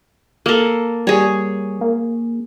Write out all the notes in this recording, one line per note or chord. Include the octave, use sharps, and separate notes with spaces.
A#3 A4
G3 G#4 C#5
A#3